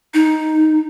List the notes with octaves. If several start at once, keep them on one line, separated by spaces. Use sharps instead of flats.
D#4